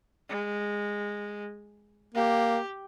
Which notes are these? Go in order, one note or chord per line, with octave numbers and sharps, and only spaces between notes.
G#3
A#3 G4